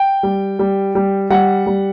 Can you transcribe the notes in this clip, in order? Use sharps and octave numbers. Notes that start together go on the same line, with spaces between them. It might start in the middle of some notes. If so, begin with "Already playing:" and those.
Already playing: G5
G3
G3
G3
G3 F#5
G3